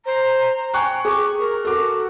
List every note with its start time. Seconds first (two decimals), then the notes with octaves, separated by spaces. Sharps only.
0.06 C5 A#5
0.74 G5 G#5 C#6 F#6
1.05 G#4 C#6 D6
1.39 A#4
1.65 F#4 A4 D6